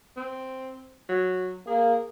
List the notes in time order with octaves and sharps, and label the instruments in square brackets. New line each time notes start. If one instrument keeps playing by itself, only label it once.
[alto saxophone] C4
F#3
[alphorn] A#3 [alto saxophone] G#4